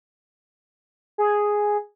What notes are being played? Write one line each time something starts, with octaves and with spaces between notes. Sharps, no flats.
G#4